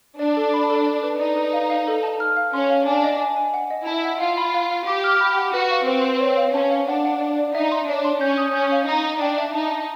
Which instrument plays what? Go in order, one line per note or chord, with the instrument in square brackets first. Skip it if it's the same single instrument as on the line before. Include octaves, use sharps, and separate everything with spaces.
[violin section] D4 [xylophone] D5
[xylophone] A4
B5
A4
D5
B4
[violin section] D#4 [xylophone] D5
[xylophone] B4
F5
F5
A4
A5
F6
F5
[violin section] C#4 [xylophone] C6
[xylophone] F5
[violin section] D4 [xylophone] G#5
[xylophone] D#5
G#5
G#5
F#5
D#5
[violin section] E4 [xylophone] A5
[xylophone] F#5
[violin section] F4 [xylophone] F5
[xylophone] B5
F5
F5
[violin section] G4 [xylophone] D6
[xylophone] F6
B5
F#5
[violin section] F#4 [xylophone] B4
[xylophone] F5
[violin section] C4 [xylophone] B4
[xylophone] B4
C#5
F5
[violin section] C#4 [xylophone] A5
[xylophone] F5
[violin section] D4 [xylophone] F#5
[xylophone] F#5
D5
D5
[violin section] D#4 [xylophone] E5
[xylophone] C6
[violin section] D4 [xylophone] C#5
[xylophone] C6
[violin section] C#4 [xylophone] G6
[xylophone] D#6
[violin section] C#4 [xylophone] G6
[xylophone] F5
[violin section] D#4 [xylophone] A#5
[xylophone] A#5
[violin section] D4 [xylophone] G5
[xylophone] E5
[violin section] D#4 [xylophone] A5
[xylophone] A5